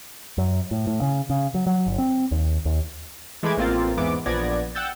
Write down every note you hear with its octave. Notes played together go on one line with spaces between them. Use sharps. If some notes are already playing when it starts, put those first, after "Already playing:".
F#2
A2
A2
C#3
C#3
F#3
F#3
G1
C4
D#2
D#2
E3 G#3 A3 B5 D6 G#6
A1 A#3 C4 F4 A6
E2 G#2 E3 B3 D6
A#1 F3 B3 D5 G#6 A#6
F#5 G5 E6 G6 A6